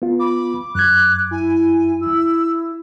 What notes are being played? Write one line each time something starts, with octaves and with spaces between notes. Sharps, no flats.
B3 F4
B5 D6
F#2 F#6 G#6
E4 G#5
E4 E6